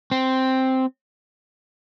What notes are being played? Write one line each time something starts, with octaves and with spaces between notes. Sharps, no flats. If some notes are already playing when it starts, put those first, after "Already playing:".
C4